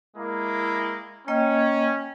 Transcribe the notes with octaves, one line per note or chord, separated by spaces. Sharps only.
G#3 A#3 E4
A#3 C#4 D#5 G5